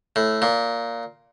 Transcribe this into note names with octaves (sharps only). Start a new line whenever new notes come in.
A2
A#2